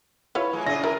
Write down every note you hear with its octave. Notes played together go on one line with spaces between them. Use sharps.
E4 F4 B4 C#5
F3 G#3 A#3
C#3 E4 F4 G#4 A#6
E4 A#4